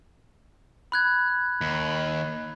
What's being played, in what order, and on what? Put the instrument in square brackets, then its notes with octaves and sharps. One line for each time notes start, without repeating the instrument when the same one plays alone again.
[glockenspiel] B5 F#6 G#6
[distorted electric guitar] D#2